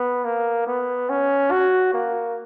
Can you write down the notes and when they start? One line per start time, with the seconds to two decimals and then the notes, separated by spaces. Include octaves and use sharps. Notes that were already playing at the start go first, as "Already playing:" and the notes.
Already playing: B3
0.25 A#3
0.67 B3
1.09 C#4
1.51 F#4
1.93 A#3